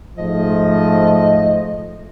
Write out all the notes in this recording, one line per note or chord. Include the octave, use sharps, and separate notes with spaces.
G#2 F3 A3 D#5